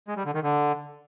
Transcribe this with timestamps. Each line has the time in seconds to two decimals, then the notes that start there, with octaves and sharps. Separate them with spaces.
0.08 G#3
0.17 G3
0.25 D3
0.34 D#3
0.43 D3